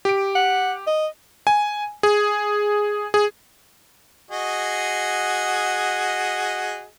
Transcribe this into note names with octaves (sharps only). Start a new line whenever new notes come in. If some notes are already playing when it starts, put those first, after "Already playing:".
G4 D7
F#5
D#5
G#5
G#4
G#4
F#4 G#4 D#5